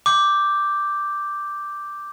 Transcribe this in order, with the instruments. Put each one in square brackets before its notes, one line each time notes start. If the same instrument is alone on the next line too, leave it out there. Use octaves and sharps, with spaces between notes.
[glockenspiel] D6 G6